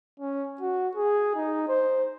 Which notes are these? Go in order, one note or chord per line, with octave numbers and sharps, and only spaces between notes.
C#4
F#4
G#4
D#4
C5